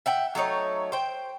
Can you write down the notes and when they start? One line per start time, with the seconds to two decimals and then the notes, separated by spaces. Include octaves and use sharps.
0.06 E5 F#5 G5
0.35 F#3 A3 D#4 C#5
0.92 C5 G5